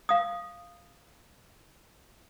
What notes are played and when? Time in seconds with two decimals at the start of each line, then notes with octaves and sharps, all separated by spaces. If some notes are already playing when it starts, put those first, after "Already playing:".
0.09 F5 D#6